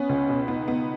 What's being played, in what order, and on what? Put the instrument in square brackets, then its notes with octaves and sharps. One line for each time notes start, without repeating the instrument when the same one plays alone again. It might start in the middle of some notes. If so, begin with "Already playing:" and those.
Already playing: [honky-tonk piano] B3 [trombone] C#4
[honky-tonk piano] C#2
B2
[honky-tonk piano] B3 [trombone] D#4
[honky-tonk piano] B3